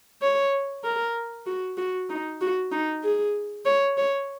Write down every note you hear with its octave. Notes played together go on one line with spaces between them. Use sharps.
C#5
A#4
F#4
F#4
D#4
F#4
D#4
G#4
C#5
C#5